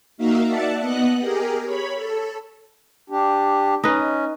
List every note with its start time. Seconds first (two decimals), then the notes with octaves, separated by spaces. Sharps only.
0.17 A#3 D#4 F#4 E5 F5
0.46 D5 E5 F#5 A5
0.80 B3 D#5 F#5 F#6
1.19 G4 G#4 A#4
1.65 C#5 B5
1.95 A4
3.10 D4 G4
3.84 C#4 D#4 B4